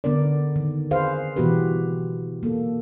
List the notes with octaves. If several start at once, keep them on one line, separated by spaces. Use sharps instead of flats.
D3 B3 D4 A#4 D5
D#3
G#4 B4 C5 F5
B2 E3 B3 F#4 G4 B4
A#3 A4